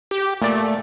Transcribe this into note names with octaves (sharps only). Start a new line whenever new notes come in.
G4
A#2 A3 D5